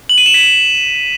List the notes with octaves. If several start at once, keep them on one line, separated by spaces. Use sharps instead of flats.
F#7
D#7
E7
B6